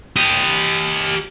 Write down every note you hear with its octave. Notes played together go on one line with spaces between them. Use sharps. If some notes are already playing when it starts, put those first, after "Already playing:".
G4 D#5